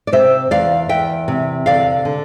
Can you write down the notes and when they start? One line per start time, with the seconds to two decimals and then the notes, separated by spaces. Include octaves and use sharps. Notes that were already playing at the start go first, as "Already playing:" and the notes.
0.07 D5
0.12 C3 C5 E5
0.51 E2 D5 F5
0.89 E2 E5 G5
1.28 C3
1.66 D3 D5 F5
2.05 D3